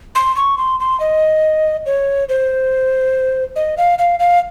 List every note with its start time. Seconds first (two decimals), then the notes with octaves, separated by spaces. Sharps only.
0.15 C6
0.36 C#6
0.58 C6
0.80 C6
1.00 D#5
1.86 C#5
2.29 C5
3.56 D#5
3.78 F5
3.99 F5
4.20 F5